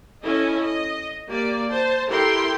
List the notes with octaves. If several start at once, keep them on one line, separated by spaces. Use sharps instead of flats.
C#4 E4 A4 D#5
D#5
A#3 G4 D5
C5 A5
E4 G4 A4 A#4 G5 C6